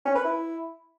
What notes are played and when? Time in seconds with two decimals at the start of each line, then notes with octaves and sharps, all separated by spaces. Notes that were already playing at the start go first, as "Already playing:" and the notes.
0.05 C#4
0.15 B4
0.24 E4